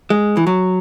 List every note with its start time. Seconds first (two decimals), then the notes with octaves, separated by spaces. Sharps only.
0.10 G#3
0.37 E3
0.47 F#3